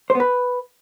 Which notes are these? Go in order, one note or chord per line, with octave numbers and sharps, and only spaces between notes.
C5
B3
B4